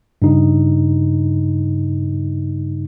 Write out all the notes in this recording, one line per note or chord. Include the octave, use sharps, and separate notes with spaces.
G2 C#3 D#4